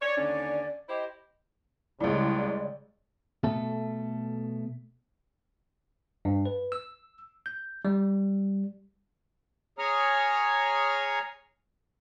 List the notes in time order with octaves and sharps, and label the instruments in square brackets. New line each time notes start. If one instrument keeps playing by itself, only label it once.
[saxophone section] C#5 [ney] D5
[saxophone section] D#2 D3 C#4
[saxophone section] E4 G4 C5 [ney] D#5
[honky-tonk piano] C#2 A2 [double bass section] C#3 G3 G#3 [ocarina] D5
[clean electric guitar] B2 A3 A4
[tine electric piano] G2
B4
E6
G6
G3
[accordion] G#4 C#5 G#5 A#5 D#6 F6